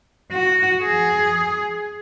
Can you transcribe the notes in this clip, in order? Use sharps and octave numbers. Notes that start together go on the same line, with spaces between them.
F#4
G#4